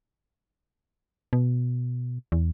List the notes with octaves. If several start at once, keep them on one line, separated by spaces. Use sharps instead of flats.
B2
E2